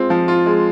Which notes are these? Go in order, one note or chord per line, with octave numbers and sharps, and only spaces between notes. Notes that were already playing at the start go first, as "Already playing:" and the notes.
Already playing: G#3 C4 F4
F3
F4
G#3